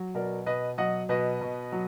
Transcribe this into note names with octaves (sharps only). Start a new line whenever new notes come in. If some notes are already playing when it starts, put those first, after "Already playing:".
Already playing: F#3
B2 A#4 D5
B2 B4 D#5
F#3 D#5 F#5
B2 B4 D#5
B2
F#3